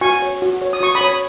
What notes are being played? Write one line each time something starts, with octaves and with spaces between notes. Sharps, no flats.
F#4 G#5 C#6
C#5
F#4
C#5
D#6
F#4 C#6
B5 D#6
C#5